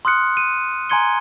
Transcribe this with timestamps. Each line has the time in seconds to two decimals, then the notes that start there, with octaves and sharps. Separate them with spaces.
0.05 C6 D#6 F6 F#6 C#7
0.37 D#7
0.90 G#5 A#5 C6 G#6 C#7 G7